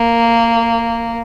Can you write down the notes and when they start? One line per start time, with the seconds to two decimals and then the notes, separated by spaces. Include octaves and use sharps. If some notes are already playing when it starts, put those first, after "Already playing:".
Already playing: A#3